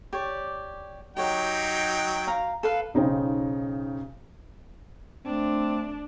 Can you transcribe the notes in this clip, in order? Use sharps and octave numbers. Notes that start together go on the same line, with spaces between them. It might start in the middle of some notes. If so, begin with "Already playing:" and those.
G4 C#5 D5
F#3 D#4 G4 C#5 F#5 G5
F5 A#5
A4 B4 F5
B1 C#3 D#4 C5 G5
A3 C4 D4